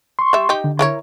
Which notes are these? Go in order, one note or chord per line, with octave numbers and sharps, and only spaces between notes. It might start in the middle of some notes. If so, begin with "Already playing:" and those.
C6 C#6
G3 E5
D#4 G4
D3
E4 A#4 C#5